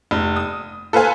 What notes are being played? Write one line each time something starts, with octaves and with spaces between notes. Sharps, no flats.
F1
D#6
A4 B4 C5 F5 G#5